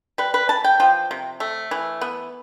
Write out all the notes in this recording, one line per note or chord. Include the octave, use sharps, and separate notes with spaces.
G3 B4
B4
E3 A5
G5
F3 G5
C3
A3
E3
B3